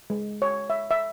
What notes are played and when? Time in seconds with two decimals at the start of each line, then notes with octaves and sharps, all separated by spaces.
0.10 G#3
0.42 C#5
0.70 E5
0.91 E5